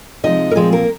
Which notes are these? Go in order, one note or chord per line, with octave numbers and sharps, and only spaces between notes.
C3 F3 G#3 D#4 D#5
A#4
A#2 F3 G#3 C4 G#4
A#3 A#4